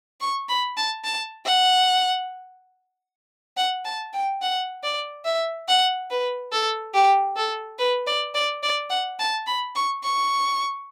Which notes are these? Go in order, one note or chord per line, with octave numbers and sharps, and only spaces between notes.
C#6
B5
A5
A5
F#5
F#5
A5
G5
F#5
D5
E5
F#5
B4
A4
G4
A4
B4
D5
D5
D5
F#5
A5
B5
C#6
C#6